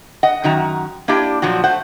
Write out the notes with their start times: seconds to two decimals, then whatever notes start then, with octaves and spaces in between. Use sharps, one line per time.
0.23 D#5 F#5
0.44 F#2 D#3 F#4 A#5
1.08 A#3 D4 E4 G4 D5
1.42 A#2 F3 F#3 F#4
1.64 A3 C5 F#5